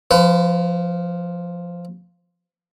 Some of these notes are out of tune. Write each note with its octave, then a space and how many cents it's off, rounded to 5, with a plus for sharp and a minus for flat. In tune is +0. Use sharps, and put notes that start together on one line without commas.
F3 +0 B4 +35